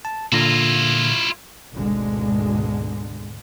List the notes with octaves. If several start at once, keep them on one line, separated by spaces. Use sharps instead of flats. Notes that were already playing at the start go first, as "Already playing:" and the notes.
A5
A#2 D3 E4 F4 A#6
G#1 D2 B2 D3 G#3